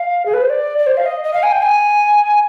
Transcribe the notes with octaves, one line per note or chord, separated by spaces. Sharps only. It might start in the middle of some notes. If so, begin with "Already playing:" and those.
Already playing: F5
G#4
B4
C5
D5
D5
C5
F5
D#5
D#5
F5
G#5
G5
G#5